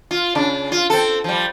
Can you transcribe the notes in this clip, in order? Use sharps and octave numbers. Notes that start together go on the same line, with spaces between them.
F4
C#3 D4
F4
C4 A4
F3 G3